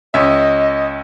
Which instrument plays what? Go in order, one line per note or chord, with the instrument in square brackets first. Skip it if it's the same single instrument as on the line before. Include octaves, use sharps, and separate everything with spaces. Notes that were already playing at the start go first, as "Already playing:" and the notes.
[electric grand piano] C#2 C#4 E5 [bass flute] D#5